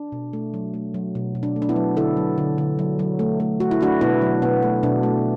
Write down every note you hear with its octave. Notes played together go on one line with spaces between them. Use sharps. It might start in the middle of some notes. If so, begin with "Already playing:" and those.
Already playing: D4
B2
A3
F#3
A3
F#3
B2
B2
D4
A3
D4
B3 E4
F#3
D3 E4 A4
F#3
D3
D3
F#3
F#3
A3
A3
A3 F#4
E4
A3 D4 F#4
B2 B3 E4
F#3
B2 B3
A3
B2 D4
A3